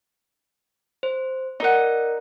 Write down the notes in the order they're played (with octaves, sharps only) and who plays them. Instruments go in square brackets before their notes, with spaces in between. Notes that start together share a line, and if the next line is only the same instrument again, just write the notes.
[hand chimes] C5
[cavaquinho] D#4 F#5 [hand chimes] A#4 D5